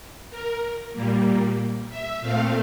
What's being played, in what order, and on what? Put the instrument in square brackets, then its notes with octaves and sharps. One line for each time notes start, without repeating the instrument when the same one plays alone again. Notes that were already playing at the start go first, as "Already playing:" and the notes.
[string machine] A#4
A#2 G3 A#3
E5
A#2 A3 C4 F5